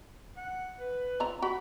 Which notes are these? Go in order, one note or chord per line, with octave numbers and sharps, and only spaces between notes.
F#5
B4
F3 C4 A#5
F#4 B5